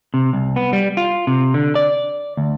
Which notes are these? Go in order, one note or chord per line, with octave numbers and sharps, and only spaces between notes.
C3
C2
B3
G3
F4
C3
D3
D5
D2